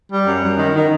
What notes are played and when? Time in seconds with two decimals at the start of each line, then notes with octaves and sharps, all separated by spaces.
0.09 G3
0.26 F#2
0.42 F#2
0.58 D#3
0.75 D#3